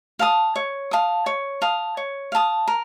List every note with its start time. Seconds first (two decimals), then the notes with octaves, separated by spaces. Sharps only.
0.19 F5 A5 D#6
0.56 C#5
0.91 F5 A5 D#6
1.26 C#5
1.62 F5 A5 D#6
1.97 C#5
2.32 F5 A5 D#6
2.68 A#4